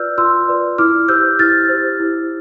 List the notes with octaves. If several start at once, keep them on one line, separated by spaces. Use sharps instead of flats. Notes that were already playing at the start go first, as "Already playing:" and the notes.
Already playing: F4 B4 D5 E6 F6 G6
F4 C6 E6
B4 D5
E4 D6 F6
G4 C5 E6 G6
E4 F6 A6
G4 C5
E4